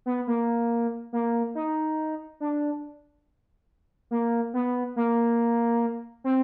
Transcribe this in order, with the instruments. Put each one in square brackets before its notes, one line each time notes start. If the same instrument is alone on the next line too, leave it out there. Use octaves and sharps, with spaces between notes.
[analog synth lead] B3
A#3
A#3
D#4
D4
A#3
B3
A#3
C4